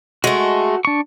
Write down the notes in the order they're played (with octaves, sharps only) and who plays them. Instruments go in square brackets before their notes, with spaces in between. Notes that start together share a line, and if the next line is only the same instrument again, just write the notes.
[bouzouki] G#3 A3 [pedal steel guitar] F#4
[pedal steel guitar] D4 C#6